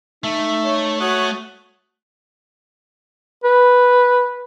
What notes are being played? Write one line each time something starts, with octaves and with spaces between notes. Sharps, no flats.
A3 D#4 E5
C#5
F#4 C#5 D#6 F#6
B4